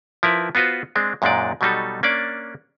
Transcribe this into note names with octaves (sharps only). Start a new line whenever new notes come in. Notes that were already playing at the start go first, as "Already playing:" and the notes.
F3 E4 A#4 B4
B3 F4 F#4 B4 C5
G#3 C4 D4
F#2 A#2 G#3 D4 D#4 D5
B2 F#3 G3 D#4 A4
A#3 C#4 D4 D5